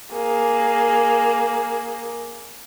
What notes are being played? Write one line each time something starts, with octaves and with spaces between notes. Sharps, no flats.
A#3 G#4